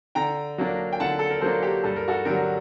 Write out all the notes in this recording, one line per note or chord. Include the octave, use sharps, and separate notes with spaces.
D3 G5 A#5
F#3 A#3 D4
G5
D3 F#5 A5
A4
A#4
F#3 A#3 D4 A4 C5
G4
G2 A4
A#4
F#4 A4
D3 F#3 G4 A#4